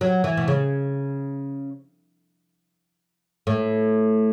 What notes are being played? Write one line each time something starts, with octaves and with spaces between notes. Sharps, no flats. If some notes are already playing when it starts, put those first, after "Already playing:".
F#3
E3
B2
C#3
A2